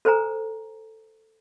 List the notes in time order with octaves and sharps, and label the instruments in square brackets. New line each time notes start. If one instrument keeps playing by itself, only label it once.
[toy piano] A4 B4 C5 G#5 A#5